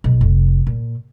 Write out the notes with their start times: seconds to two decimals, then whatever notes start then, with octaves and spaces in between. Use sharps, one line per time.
0.04 B1
0.21 F1
0.67 A#2